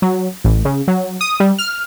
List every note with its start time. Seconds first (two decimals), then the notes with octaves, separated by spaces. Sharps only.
0.02 F#3
0.44 A1
0.65 C#3
0.88 F#3
1.21 D#6
1.40 G3
1.58 F6